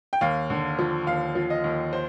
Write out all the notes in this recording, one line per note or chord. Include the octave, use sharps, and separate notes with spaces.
G5
D#2 F5
D3
F3
D#2 F5
F3
D#5
D#2
C5